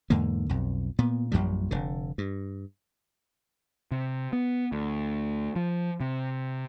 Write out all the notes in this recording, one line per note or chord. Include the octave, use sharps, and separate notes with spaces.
E2 G#2 D3 A#3
B1 F2
A#2 B3
A#1 F#2 F3 G3
F1 D3
G2
C3
B3
D2
F3
C3